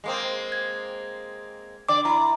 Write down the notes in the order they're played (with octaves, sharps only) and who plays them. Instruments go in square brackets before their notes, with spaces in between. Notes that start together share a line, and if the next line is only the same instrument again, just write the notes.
[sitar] G#3 A#3 C4
[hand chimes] G#6
[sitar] D3 D5 [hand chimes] D6
[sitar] E4 [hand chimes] A#5